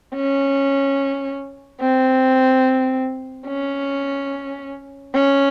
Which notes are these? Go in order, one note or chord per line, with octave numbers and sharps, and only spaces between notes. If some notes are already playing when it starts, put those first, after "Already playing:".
C#4
C4
C#4
C#4